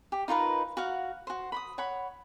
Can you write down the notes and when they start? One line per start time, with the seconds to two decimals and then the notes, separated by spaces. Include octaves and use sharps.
0.12 G4
0.28 D#4 F4 A#4 B4
0.77 F#4 F5 F#5
1.27 F#4 C5
1.52 B5 C6 D#6
1.78 C#5 F#5 B5